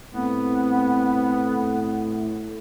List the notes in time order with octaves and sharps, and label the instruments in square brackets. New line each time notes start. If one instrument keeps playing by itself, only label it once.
[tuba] A2 [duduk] B3 [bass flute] C4